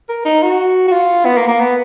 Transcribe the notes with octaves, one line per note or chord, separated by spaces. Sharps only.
A#4
D#4
F#4
F#4
F4
B3
A#3
A#3
B3